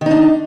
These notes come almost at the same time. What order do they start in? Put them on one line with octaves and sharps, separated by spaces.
D#3 D#4 D4